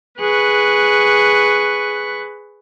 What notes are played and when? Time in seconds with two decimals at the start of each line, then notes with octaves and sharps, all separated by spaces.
0.19 G#4 B4 C#6 F#6